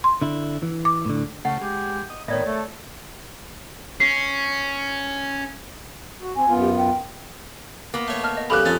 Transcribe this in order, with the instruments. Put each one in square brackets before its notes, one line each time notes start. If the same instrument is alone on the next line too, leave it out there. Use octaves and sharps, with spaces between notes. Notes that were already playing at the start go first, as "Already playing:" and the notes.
[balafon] C6
[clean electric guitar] D3 E4
E3
[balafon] D6
[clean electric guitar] A2 D3
[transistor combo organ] C#3 A3 [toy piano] F#5
[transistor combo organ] G#3 [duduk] G4
[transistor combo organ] D#5
[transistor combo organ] A2 B3 [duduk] D#3 [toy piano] C#5 D5 E5
[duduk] A3 [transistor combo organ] A4
[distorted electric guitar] C#4 [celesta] C7
[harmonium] F#4
[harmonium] C4 [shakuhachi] G#5
[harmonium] F#2 B3 F4
[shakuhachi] G4
G5
[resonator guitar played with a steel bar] A#3 B3
[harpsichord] A3 C#5
[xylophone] D#5 A5 F6
D#5
[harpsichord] C#3 G3 [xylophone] G4 A4 F7 [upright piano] B5 D6 F#6
[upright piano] F2 [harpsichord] G#3 C#4 [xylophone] A6